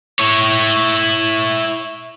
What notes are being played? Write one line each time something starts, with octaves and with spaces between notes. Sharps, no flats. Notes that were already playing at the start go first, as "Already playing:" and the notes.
E4 C#5